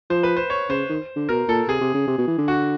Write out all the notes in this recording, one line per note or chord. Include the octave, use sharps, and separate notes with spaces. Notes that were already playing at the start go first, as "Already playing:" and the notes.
F3 C5
B4
C5
C#5
C#3 C5
D#3
D3
B2 A#4
A#2 A4
C3 G#4
C3
C#3
C3
B2
E3
D3
F#4